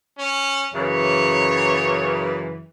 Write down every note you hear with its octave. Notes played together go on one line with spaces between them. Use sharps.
C#4
F#2 C#3 E3 C#5